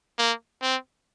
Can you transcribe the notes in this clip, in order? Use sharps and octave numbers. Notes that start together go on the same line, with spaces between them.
A#3
C4